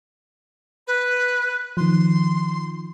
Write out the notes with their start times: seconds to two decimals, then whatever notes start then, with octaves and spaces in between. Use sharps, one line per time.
0.87 B4
1.77 D#3 F3 C6